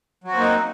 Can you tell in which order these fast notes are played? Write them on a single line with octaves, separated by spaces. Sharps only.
F#3 F#4 C4 A#3 D#4